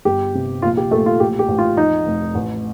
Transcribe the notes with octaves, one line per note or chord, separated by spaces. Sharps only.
G1 G4
C3
A#1 F4
G4
A#1 A3
F4
A1 G4
G4
A1
F4
F2 D#4
F1
A1